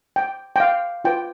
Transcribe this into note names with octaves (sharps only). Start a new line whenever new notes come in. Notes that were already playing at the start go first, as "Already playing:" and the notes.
G5
G5
F5
F4 B4 G5